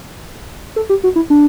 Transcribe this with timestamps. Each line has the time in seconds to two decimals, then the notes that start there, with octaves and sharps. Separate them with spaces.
0.76 A4
0.89 G4
1.04 F#4
1.16 E4
1.30 D4